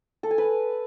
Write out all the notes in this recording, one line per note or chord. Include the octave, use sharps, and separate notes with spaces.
A4
G#5
B4